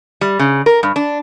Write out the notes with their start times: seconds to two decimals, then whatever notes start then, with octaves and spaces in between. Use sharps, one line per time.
0.21 G3
0.39 C#3
0.66 A#4
0.83 G2
0.96 D4